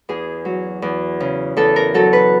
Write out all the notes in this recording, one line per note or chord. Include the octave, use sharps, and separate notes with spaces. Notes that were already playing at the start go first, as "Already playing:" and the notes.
E2 G#4
F#3
E2
C#3
E2 A4
A#4
F#3 A4
B4